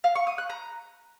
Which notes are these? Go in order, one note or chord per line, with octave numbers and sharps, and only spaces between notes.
F5
C#6
D#6
F#6
A#5